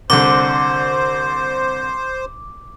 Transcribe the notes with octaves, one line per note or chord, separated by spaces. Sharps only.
C2 D3 C5 D6